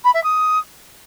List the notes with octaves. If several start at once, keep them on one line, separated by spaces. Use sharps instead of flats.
B5
E5
D#6